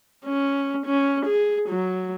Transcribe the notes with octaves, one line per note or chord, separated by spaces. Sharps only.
C#4
C#4
G#4
F#3